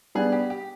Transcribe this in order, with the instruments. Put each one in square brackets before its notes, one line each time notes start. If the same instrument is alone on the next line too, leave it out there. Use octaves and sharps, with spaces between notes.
[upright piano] G3 B3 D4 [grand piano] G#4
[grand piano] G4
G4